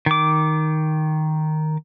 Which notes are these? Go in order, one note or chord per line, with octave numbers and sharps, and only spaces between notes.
D#3 D6